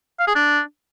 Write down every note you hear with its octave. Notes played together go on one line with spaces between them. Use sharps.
F5
G#4
D4